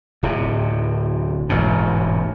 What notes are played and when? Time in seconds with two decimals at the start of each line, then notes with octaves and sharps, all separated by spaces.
0.23 D1 A2 C3
1.49 E1 A1 G#2 B2